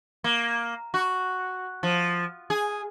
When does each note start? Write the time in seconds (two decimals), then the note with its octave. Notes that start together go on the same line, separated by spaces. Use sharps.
0.24 A#3
0.94 F#4
1.83 F3
2.50 G#4